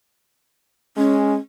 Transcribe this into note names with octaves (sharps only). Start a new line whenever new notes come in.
G#3 C#4